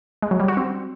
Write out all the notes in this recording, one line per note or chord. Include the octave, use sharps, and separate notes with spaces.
G#3
F#3
G3
F#4
C4